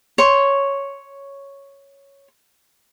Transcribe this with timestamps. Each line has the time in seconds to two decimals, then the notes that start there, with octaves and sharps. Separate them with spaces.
0.18 C#5 C6